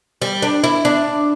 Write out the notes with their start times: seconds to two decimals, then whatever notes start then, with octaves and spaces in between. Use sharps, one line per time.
0.22 G3
0.42 D4
0.64 E4
0.85 D4